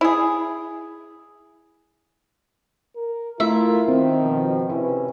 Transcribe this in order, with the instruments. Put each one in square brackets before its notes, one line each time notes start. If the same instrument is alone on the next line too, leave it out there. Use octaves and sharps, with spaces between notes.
[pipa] E4 G#4
[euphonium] A#4
[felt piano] A3 [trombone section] E4 A#4 [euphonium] F4 [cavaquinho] E5
[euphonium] D#3 [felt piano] C4
[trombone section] B2 F3
[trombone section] C3 C#4 E4 [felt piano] B4